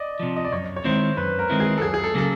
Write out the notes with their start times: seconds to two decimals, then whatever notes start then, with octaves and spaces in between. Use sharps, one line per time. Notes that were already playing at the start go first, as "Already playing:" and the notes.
Already playing: D5 D#5
0.20 C3 F3
0.36 D#5
0.45 D5
0.52 F#2 C#5
0.76 C#5
0.84 D#3 G#3 C4 E4 C5
1.17 F#2 B4
1.39 A#4
1.50 D#3 G#3 C4 E4
1.60 G#4
1.78 A4
1.82 F#2 G#4
1.94 G#4
2.04 A4
2.14 C#3 F#3 A#3 A4